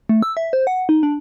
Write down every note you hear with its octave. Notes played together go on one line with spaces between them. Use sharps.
A3
E6
E5
C5
F#5
D#4
D4